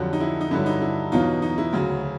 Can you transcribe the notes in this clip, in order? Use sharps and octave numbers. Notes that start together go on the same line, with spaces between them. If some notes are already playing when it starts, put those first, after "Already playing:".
Already playing: F2 D3 F#3 G4 A4
D#4
E4
D#4
G2 D3 F#3 E4
D#4
E4
E2 B2 F#3 D#4 F4
D#4
E4
D2 C#3 F#3